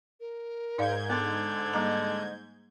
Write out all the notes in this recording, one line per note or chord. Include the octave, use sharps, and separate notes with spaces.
A#4
G#2 D#4 D5 F5 G6 G#6
D3 B3
G3 A#3 D#5 A#5